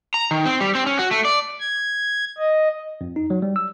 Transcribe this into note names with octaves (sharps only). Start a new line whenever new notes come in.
A#5
D#3
C4
G3
C4
C#4
F#4
A3
D5
G#6
D#5
F2
D#4
F#3
G3
E6